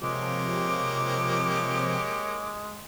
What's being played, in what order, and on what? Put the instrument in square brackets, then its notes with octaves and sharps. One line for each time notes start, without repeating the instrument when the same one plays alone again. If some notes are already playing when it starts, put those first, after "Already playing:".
[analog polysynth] C3 F3 [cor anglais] G#3 [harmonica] A#3 G4 C#5 [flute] D6